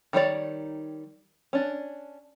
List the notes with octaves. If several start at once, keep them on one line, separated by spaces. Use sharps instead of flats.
D#3 G3 D#4 C#5 D5
C#4 D4